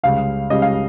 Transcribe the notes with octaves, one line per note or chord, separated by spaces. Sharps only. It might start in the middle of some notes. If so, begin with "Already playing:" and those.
C#2 C#3 G3 F5
C#2 C#3 G3 D#5
F5